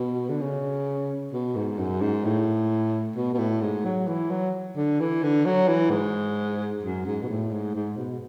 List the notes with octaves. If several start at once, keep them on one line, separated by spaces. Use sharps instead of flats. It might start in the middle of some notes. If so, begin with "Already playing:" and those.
Already playing: B2
D3
C#3
B2
G#2
F#2
G#2
A2
B2
B2
A2
G#2
F#3
E3
F#3
D3
E3
D3
F#3
E3
G#2
F#2
G#2
B2
A2
G#2
G#2
B2